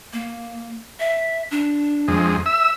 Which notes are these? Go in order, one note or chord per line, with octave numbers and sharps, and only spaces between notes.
A#3
E5
D4
F2 G#3
E5 E6